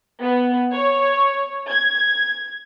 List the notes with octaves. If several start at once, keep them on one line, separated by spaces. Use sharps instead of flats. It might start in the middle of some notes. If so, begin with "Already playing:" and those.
B3
C#5
G#6